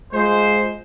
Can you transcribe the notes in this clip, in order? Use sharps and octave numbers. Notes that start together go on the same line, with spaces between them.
G#3 F4 C5